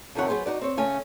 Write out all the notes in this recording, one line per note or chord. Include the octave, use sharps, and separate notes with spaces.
F2 C3 D#3 D#4 C#5 F#5
F#3 B3 G#4 B4 C5
D#4 F#4 D5
C4 C#5
C#3 A3 C#4 G#5